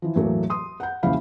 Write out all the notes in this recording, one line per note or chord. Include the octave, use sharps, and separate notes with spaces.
E3 F3
E2 A2 F#3 A3 A#3
C6 D#6
F#5 G6
E1 A#1 C#3 E4 F5 B5